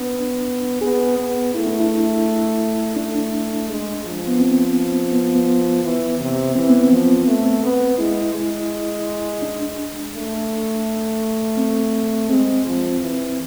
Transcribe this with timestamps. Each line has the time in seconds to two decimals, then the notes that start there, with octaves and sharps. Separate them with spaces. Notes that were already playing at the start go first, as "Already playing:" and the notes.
Already playing: B3 D4
0.81 B3 G#4
1.18 B3
1.54 A3 E4
1.66 D4
1.80 E4
2.96 A3 D4
3.69 G#3
4.05 F3
4.27 B3
4.40 C4
5.13 B3
5.35 B3
5.84 E3
6.19 C3
6.55 E3 C4
6.69 B3
6.82 C4
6.91 F3
7.27 A3
7.63 B3
7.98 G#3 E4
8.35 G#3
9.42 D4
10.14 A3
11.57 C4
12.30 G#3 C4
12.65 F3
13.00 E3